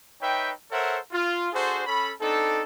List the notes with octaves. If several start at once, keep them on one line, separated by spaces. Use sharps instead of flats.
D#4 B4 C#5 E5 G5
A4 A#4 C5 C#5 E5 F#5
F4
D4 F#4 G#4 A4 C5
C#4 A4 B5
C4 D4 D#4 A4